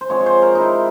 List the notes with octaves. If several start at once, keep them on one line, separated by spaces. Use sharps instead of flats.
C5
F3 G#3 C4 C#5
C#5
C5
A#4
D#4 E4